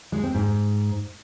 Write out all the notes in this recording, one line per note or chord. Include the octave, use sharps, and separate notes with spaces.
G#3
C4
G#2